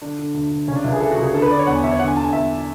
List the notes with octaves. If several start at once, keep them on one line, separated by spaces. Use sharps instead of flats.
D3 D4
D3
D2
D2
C#3 C#4
D4
C#2 E4
G#4
E3 A4
F#4
C#2 G#4
D3 A4
B4
D3 D5
C#5
E2 F#5
G#5
E2 E5
C#5
D3 F#5
G#5
D3 A5
G#5
E2 E5